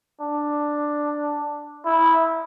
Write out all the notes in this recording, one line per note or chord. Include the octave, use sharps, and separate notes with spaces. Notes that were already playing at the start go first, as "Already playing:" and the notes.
D4
E4